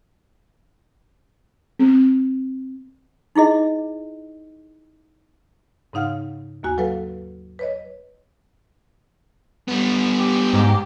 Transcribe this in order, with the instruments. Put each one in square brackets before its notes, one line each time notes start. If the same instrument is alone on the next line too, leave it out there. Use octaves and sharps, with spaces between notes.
[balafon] C4
[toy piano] D#4 E4 G#4 D#5
[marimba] G#2 C#3 D#4 F5 F#5 F6
D#2 A#3 F#4 G#5
F#3 A4 B4 F5
B4 C#5 D#5
[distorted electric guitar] G3 B3
[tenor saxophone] G4
[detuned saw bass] G#2